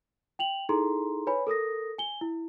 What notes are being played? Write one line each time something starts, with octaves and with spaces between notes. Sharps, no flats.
G5 F7 F#7
D#4 E4 G#4 A4 A#5 C6
B4 C#5 G#5 B5
A4 A#4 D#6 A#6
G#5 G7
E4